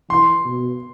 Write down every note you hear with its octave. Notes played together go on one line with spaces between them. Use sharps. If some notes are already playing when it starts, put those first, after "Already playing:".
E3 C6
B2